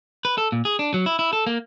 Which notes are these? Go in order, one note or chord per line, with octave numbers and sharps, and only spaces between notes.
B4
A4
A#2
G#4
D4
F#3
E4
E4
A4
A#3